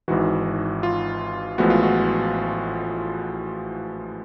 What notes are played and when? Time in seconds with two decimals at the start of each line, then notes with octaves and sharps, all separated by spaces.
0.08 G#1 G#2 E3 F#4
0.83 F4
1.58 A1 A2 F3 G#3 B3 F#4
1.70 F4
1.83 F#4